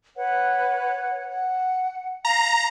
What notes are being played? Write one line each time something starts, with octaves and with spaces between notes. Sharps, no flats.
B4 C#5 F#5
F#5
F5 A#5